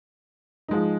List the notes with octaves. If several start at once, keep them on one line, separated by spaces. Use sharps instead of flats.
F3 G#3 D#4